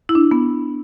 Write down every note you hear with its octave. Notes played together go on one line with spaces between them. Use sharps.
E4
D4
B3